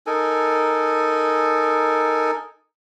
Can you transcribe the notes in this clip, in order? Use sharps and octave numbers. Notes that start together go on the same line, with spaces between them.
D#4 A4 A#4 G#5